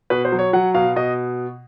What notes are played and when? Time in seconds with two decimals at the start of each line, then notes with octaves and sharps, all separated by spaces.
0.10 B2 B4
0.25 C5
0.32 F#3
0.39 C#5
0.53 F#3 F#5
0.74 B2 F5
0.96 B2 D#5